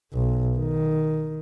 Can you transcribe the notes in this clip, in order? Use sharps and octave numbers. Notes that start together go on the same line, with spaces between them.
B1
D#3